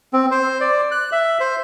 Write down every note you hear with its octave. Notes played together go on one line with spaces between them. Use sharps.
C4
C5
D5
F#6
E5
C5